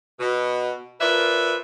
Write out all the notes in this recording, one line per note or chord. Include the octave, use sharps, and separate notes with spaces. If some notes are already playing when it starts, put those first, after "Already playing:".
B2
F3 A#4 B4 D5 E5